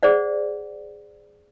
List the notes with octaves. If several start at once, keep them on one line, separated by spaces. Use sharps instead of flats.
G#4 C5 D5 F#5